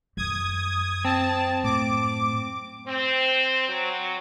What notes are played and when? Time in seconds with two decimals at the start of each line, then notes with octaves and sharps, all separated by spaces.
0.17 F#2 D#6 G#6
1.05 C4 A5
1.64 A2 D6
2.87 C4
3.69 F#3